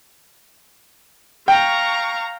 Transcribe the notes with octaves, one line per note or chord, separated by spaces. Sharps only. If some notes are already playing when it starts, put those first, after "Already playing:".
F5 G5 A#5 C#6